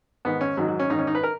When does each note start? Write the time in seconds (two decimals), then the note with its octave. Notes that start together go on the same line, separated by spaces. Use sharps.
0.25 G#2 D#3 B3
0.41 C#4
0.57 G#2 D#3 F#3
0.68 F#3
0.80 C#4
0.90 G#2 D#3 D#4
0.99 C#4
1.07 D#4
1.15 B4
1.23 A#4